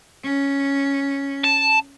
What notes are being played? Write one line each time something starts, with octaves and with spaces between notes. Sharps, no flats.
C#4
A5